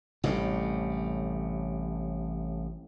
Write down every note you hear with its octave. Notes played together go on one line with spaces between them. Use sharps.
A1 A2 C3 G3